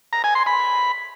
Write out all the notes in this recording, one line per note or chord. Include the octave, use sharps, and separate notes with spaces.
A#5
G#5
C6
B5